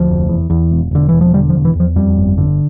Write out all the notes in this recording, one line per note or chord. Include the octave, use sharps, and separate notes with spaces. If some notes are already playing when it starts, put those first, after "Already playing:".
Already playing: D2 F3
F1
E2
E2
E1
E1 D3
E1 E3
F3
D3 G3
F3
E1
E3
E2 F3
F2 G3
G1
D3